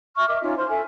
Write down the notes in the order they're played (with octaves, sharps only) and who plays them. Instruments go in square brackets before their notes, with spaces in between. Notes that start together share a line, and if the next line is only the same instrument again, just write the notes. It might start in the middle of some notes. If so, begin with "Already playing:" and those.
[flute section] E5 C#6 F6
A#4 D#5 E5 D6
C#4 D#4 F4 C#5
C5 C6 F6
A4 E5 G#5